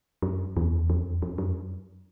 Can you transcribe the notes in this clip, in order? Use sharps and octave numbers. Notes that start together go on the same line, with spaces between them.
F#2
E2
F2
F2
F#2